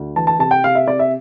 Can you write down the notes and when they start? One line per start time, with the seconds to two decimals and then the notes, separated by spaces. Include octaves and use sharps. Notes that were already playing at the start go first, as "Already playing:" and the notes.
Already playing: D2
0.16 E3 A5
0.27 A5
0.39 C3 A5
0.51 G5
0.64 C3 F5
0.75 E5
0.87 C3 D5
0.99 E5